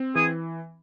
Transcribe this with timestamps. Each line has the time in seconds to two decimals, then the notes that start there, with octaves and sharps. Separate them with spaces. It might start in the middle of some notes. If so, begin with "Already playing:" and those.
Already playing: C4
0.15 E3 G#4